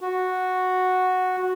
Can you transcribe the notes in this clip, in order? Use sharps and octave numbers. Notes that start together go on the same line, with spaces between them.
F#4